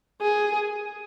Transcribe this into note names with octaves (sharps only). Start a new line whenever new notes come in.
G#4